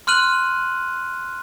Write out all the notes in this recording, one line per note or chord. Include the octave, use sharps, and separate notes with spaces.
C6 F6 F#6 D#7 F#7